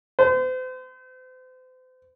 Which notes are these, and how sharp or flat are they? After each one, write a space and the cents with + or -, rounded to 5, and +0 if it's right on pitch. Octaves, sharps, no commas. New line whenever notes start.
C5 -40